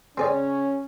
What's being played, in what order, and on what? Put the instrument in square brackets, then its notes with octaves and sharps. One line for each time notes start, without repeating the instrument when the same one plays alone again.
[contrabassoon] C#3 [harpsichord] C4 G#4 D5 [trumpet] C#4